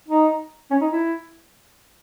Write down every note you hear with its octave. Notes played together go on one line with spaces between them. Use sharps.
D#4
C#4
D#4
E4